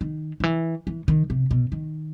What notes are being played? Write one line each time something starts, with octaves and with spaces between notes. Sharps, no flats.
D#3
D#3
E3
E3
D#3
C3
B2
D#3